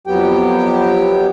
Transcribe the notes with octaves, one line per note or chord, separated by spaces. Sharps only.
F2 F#3 B3 G4 G5